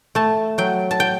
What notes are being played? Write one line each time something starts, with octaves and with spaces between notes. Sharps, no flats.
A3 A5
F#3 G5
A5
G5